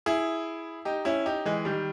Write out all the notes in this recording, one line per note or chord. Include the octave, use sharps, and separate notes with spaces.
E4 G#4
D#4 G4
C#4 E4
D#4 G4
E3 G#3
D#3 G3